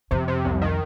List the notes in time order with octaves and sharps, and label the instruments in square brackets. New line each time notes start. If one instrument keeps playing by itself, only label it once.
[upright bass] F2 [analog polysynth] C3
[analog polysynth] C3
C2
D#3